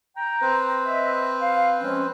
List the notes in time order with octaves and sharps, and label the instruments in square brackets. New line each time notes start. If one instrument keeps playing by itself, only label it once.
[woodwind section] G5 A#5
[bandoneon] C4 B4 C5
[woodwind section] D#5 E5
F5
F3 G#3 C#4